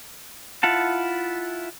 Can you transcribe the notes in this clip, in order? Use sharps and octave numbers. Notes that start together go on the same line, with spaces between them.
E4 F4 F#5 A5